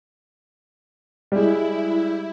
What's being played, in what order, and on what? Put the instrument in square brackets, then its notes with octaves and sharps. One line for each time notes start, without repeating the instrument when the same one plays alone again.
[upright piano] G3 G#3 [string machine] E4